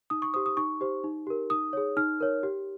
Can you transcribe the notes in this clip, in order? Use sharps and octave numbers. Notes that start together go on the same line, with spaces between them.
D#4 D#6
C#6
G4 C5 D#6
D#6
D#4 C#6
G4 C5
D#4
G4 A#4
D#4 D#6
G#4 C#5
D#4 F6
A#4 C#5
G4